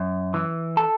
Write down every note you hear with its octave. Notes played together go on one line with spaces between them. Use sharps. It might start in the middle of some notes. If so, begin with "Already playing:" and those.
Already playing: F#2
E3
A4